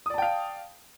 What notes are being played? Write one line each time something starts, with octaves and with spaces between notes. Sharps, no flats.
D5 F5 G5 A5 D#6